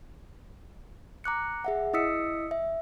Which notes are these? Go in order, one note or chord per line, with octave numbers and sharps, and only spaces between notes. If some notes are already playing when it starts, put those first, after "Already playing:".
A#5 D6 F#6 C#7
G#4 E5 F#5
E4 D#5 D#6 E6 B6 C#7
E5